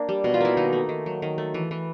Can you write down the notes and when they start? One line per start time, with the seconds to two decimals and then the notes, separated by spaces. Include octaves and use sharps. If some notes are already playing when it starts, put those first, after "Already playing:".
Already playing: A#3 D4
0.09 G3
0.24 B2
0.34 F4
0.41 A#3 E4
0.57 D#3 D#4
0.73 A3
0.89 D#3
1.06 F#3
1.22 D#3
1.38 A3
1.54 E3
1.71 E3